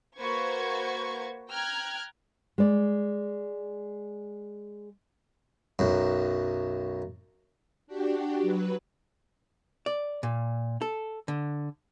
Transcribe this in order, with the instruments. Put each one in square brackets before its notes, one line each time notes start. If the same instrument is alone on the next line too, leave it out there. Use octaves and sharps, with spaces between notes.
[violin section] A#3 F#4 B4 C5 C#6 G#6
G5 A#5 F6 F#6 G#6
[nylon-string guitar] G#3 D5
[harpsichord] B1 F#2
[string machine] D4 F#4 G4
F#3 B4
[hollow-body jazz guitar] D5
A#2
A4
D3